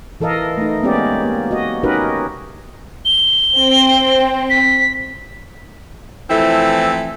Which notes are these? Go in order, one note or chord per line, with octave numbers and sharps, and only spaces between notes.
E3 A4 A#4 D#5 F5
A3 D#4
G#3 A#3 B3 C#4 G4 D5
A#3
F#4 D#5
C#4 D#4 F#4 G4 A#4 B4
G7
C4
B6
E3 F3 A3 C4 E4 A4